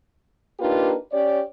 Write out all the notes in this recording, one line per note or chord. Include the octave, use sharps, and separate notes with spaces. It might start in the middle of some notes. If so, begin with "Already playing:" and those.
A#3 D4 D#4 F4 G4 B4
C#4 G4 C#5 D5